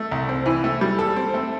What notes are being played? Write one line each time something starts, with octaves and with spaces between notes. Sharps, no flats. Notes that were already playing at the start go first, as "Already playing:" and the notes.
Already playing: A3
C2
C4
E3
A3
G3
A4
C4
A3